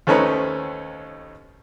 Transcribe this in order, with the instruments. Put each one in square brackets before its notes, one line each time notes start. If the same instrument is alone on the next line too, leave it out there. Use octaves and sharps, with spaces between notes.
[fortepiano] D#2 A3 C4 C#4 D#4 B4